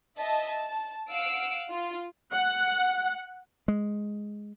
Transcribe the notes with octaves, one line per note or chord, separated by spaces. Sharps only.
D#5 E5 A5
A5
F5 F#5 E6 D7
F4
F#5
G#3